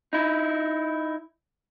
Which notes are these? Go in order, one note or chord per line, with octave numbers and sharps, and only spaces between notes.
D#4 E4